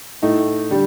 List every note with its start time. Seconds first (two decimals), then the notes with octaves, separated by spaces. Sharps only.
0.22 A2 A3 D#4
0.71 D3 G3